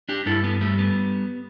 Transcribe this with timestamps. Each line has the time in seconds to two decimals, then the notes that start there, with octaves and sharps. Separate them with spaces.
0.09 D4 G4
0.26 G2 E4 A4
0.44 B3
0.61 G3 A3
0.78 B3